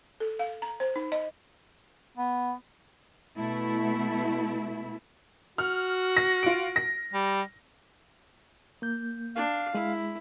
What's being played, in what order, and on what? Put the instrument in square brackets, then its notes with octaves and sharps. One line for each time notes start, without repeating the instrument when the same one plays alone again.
[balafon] A4
F5
A#5
C5
D#4
D#5
[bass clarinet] B3
[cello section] B2 A3 E4
[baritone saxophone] F#4 [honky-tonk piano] F6
[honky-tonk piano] A#6
F4 D7
A#6
[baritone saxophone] G3
[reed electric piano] A#3 G6
[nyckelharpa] D4 [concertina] F5
[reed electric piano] G#3 [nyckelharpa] E4